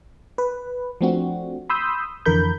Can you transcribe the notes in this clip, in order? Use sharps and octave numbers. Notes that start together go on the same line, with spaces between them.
B4
F3 A3 C4 D4 F#4
B5 C6 D#6 E6 G6
F2 D3 E3 A#4 B5 G6